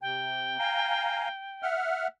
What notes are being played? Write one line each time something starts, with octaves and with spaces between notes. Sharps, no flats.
C3 G5
F5 G#5 A#5
E5 F#5 F6